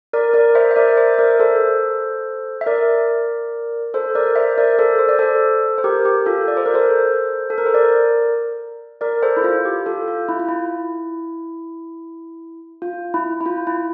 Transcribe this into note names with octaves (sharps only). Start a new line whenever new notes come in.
A#4 D5
A#4 D5
C5 E5
E5
A#4 D5
C5 E5
E5
A#4 D5
A4 C5
E5
A#4 D5
A4 C5
A#4 D5
C5 E5
A#4 D5
A4 C5
C5
D5
A4 C5
C5
G4 A#4
G4
F4 A4
D5
C5
A#4
A4 C5
A4
A#4
C5
A#4 D5
A#4 D5
A4 C5
E4
F4
G4
F4 A4
F4
E4
F4
E4
F4
E4
E4
F4
E4